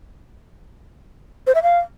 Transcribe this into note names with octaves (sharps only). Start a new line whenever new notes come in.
C5
E5
F5